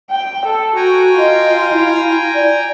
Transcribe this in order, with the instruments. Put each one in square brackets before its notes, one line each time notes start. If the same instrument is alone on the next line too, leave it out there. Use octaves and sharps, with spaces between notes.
[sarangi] G5
A4
[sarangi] F#4 [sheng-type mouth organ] G5 G#5 A#5
[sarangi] F4 [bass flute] D#5
[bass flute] E4
D5